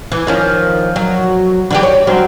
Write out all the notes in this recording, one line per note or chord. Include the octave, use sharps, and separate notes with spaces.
E3
D#3 F3 C#4
F#3
D3 E3 G4
C#5
G2 F#3 C4